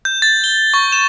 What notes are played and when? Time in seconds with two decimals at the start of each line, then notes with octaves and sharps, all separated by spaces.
0.05 G6
0.22 A6
0.44 G7
0.74 C#6
0.92 E7